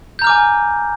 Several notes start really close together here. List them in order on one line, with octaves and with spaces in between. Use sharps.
G6 A#5 F6 D6 G#5